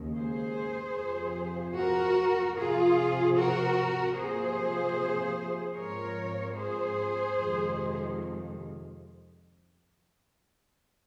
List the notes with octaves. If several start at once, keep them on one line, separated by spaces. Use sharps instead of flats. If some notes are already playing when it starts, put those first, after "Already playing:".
Already playing: D#2 C#3 G#3
G#4 C5
F2 C3 F3
F#4 A#4
C3 F3 C4 F4 G#4
F#4 A#4
C3 F3 A#3 G#4 C5
G#2 F3 G#3 C4 A#4 C#5
G#4 C5
F2 C3 D#3 G#3